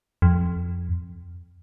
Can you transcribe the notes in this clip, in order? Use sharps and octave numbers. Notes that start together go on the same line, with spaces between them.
F2